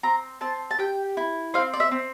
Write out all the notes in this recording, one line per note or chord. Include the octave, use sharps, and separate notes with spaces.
C4 A#5
C4 A5
A5
G4 G5
E4
C4 F5
D5
E5
C4